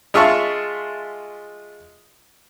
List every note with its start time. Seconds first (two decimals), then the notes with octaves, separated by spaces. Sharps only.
0.14 G#3 F4 E5 A5 C#6